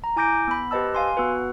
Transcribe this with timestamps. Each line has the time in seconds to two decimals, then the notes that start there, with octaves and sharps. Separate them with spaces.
0.04 A#5
0.16 E4 G#5 D6 G6 A#6 D7
0.48 B3 B5
0.71 G4 B4 C5 D#5 A5 E6
0.95 F5 G#5 C6
1.17 B3 F#4 B4